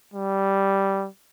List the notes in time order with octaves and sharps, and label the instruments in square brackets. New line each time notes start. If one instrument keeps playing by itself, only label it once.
[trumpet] G3